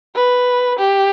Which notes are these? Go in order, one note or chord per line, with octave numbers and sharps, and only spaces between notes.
B4
G4